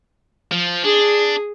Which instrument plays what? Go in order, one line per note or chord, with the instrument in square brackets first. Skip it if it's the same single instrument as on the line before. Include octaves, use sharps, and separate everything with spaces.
[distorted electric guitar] F3
[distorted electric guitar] D4 [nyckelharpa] G#4